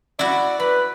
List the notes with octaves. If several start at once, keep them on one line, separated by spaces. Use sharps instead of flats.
E4 F#4 D5
B4 B5